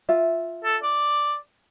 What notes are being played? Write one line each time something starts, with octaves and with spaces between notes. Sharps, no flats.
F4 E5
A4
D5